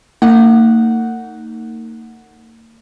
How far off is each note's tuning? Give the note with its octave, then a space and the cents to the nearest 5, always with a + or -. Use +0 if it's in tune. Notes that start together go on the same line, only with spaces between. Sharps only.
A#3 -40 D#4 +0 F#5 +0